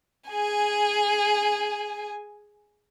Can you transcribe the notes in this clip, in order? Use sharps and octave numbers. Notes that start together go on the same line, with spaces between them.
G#4 G#5